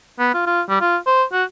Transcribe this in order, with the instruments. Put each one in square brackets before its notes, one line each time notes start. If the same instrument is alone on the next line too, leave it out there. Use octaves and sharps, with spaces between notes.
[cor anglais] B3
F4
F4
G3
F4
C5
F#4